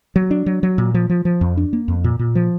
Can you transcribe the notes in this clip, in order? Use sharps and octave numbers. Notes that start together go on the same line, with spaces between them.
F#3
D4
F#3
F#3
A#2
F3
F3
F3
F2
D4
A#3
F2
A#2
A#2
F3